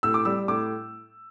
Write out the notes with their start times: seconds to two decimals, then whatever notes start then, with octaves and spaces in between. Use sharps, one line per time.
0.03 A2 E6
0.14 D6
0.25 G3 E6
0.48 A2 D6